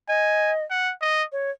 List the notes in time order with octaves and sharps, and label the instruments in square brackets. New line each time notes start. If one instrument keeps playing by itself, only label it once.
[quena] D#5 [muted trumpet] G#5
[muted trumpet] F#5
D#5
[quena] C#5